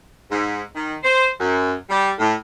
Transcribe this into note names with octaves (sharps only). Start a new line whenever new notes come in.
G#2
D#3
C5
F#2
G3
A2